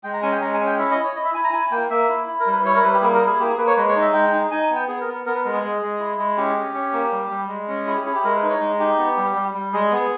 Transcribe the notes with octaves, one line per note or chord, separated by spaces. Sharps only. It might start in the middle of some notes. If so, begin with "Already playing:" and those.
G#3 G5
A#5
C#4 G#5
G5
G#3 A#5
G#5
C#4
G5
E4 E5
D#5
E4
C#5
E4 D#5
E5
E4 G#5
A#5
E4 G#5
A#3 G5
A#3 E5
E4
E4
A#4
G3
B4
E4 C#5
A#4
G3 B4
G4
A#3 G#4
A#4
E4
G#4
A#3 G4
G#4
A#3 B4
C#5
G#3 B4
C#5
D#4
E5
G#3 G5
D#4
D#4 G#5
G#5
B3
G5
B3 G#4
A#4
B3
B3 A#4
B4
G#3 A#4
G#4
G#3
G#3
E4
G#3
C#4 G4
C#4
C#4
A#3
G3
G3
G#3
C#4
E4 G#4
G4
E4 G#4
G4
G#3 A#4
B4
D#4
C#5
G#3
D#4 G4
B3
G3
G3
G3
G#3 G#4
B3